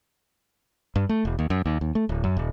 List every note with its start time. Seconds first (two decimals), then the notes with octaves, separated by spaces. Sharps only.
0.96 G2
1.09 A3
1.25 E1
1.39 D#2
1.50 F#2
1.66 D#2
1.81 D#2
1.95 A3
2.09 D1
2.24 F#2
2.37 D#1